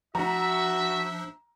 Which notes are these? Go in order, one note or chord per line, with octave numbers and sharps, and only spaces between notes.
F3 D4 F#4 E5 A#5